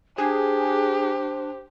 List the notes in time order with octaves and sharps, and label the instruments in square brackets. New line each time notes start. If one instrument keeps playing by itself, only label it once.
[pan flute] D4 [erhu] G4 [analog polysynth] G#4 [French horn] C5